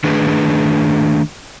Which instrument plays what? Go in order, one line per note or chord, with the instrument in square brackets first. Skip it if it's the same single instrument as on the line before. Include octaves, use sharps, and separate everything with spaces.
[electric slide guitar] D#3 A3 D4 G#4 B4